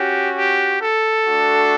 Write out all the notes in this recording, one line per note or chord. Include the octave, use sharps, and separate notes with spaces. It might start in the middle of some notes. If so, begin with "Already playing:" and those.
Already playing: C#4 F#4 G4
G4
A4
A3 D4 F#4